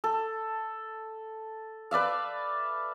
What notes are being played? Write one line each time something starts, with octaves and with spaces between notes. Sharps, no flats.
A4
B4 D5 E5 F5